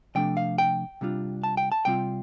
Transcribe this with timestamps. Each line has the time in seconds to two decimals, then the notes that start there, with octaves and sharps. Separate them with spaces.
0.15 C3 F3 A3 D4 G5
0.37 F5
0.58 G5
1.01 C3 G3 D4 F4
1.43 A5
1.57 G5
1.72 A5
1.85 C3 G3 C4 F4 G5